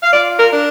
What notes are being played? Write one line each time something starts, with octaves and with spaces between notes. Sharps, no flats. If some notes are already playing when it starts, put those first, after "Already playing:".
F5
F4 D5
A#4
D4